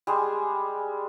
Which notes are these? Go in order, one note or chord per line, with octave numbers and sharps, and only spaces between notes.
G3 G#3 G#4